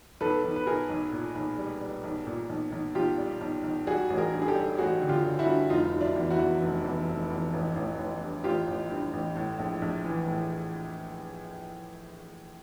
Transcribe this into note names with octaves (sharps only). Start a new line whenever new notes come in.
B1 A4 B4
B1
B4
B1 G#4 A#4
B1
A#2
B1
G3
G3
B1
A#2
B1
B1
B1 F4 G4
G3
B1
B1
G3 F#4 G#4
A1
G#4 A#4
G2
G#4
G4 A4
G3
A1 F#4 G#4
D3
F4 G4
D3
E4 F#4
G2
F1 D#4 F4
F#3
D4 E4
E2
E4 F#4
E2
F1
E2
F1
E2
A1
A1
A1
G2
A1 F4 G4
A1
G2
A1
A2
A#1
A#1
E3
A2